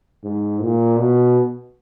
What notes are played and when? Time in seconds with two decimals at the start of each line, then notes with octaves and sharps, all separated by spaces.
0.24 G#2
0.62 A#2
0.98 B2